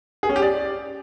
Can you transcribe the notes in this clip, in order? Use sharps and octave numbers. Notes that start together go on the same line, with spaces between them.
G#4
C#4
G4
D5